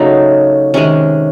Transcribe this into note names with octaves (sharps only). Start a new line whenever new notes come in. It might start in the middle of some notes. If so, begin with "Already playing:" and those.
Already playing: C#3 F#3 A3 D#4
C3 D#3 G#3 C#4